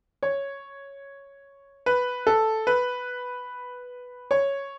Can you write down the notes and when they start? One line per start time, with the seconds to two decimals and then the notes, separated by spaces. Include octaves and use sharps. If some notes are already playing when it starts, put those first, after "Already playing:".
0.23 C#5
1.86 B4
2.27 A4
2.67 B4
4.31 C#5